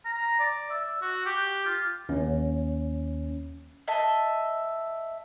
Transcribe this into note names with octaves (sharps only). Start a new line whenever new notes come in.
A#5
D5
E5
F#4
G4
F4
D#2 C#4
D#5 E5 A5